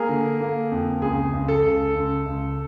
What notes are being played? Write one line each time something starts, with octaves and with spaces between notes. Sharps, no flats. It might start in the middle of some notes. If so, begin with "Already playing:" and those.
Already playing: A#3 G#4 A#4
D3
A#3
F2
C#2 G#4
C#2
A4
C#2
C#2
C#2